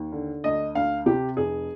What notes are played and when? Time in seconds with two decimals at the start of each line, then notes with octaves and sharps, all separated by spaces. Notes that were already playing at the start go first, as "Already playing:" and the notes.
Already playing: D#2
0.12 D3
0.44 D2 D#5
0.75 D2 F5
1.06 C3 G4
1.37 F1 G#4